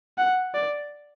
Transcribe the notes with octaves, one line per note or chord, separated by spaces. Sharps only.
F#5
D5